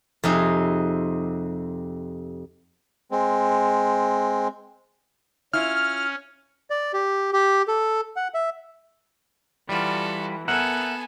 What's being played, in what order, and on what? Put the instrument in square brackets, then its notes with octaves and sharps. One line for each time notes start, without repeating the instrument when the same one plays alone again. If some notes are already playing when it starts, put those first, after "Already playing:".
[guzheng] F2 C3 D#4 G#4
[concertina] G#3 C4
[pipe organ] C#4 [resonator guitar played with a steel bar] E4 F4 [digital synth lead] F6
[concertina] D5
G4
G4
A4
F#5
E5
[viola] E3 [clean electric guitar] G3 F4 [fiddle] F#4 A4
[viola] B3 G#5 [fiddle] A4 [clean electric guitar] A#4 E5 F#5